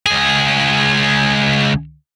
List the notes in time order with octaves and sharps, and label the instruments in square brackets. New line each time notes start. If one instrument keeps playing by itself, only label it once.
[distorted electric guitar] C#2 G#4